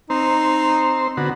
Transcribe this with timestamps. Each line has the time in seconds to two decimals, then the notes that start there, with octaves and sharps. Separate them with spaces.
0.10 C4 D#4 C5
1.17 D3 B3 F#4